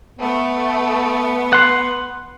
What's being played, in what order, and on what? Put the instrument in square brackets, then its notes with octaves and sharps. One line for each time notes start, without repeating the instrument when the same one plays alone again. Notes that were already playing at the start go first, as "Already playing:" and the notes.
[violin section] A3 [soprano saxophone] B3
[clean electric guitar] F#5 C6